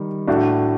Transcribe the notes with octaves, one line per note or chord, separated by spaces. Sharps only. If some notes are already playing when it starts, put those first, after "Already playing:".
Already playing: D#3 G3
A2 A3 D4 F#4